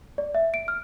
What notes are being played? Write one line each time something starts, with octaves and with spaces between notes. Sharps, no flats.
D5
E5
D7
F6